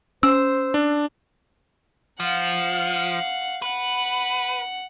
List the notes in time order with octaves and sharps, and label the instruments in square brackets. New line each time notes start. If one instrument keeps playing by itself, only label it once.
[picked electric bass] C#4 [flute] C5 [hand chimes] E6
[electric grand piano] D4
[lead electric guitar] F3 [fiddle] F5 F#5
[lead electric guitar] B4 [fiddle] F#5